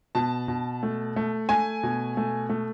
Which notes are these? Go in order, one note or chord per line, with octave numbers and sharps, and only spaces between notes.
B2 A5
B2
A3
A3
A3 G#5
B2
A3
A3